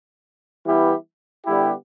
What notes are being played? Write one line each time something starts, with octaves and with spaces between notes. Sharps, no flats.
E3 G3 B3 E4 G4
D3 G3 B3 E4 G4